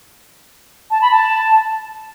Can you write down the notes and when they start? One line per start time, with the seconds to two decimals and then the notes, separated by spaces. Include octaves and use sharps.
0.91 A5
1.02 B5
1.11 A5